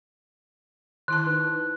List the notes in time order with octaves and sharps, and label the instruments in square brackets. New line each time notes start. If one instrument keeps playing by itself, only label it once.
[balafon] D#3 E4 A5 [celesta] C6 [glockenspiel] F#6
[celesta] D#4 B4